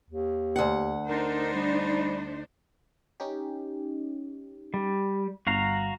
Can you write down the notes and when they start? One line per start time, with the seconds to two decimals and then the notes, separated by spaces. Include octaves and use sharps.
0.10 D#2
0.56 D2 F#5
1.08 D4 D#4 A#4 C5
1.54 G3
3.20 C#4 D#4 G4
4.74 G3
5.47 G1 F#4 F5 A#5